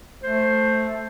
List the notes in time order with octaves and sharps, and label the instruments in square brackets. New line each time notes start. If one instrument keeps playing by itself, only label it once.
[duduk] A3 [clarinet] C5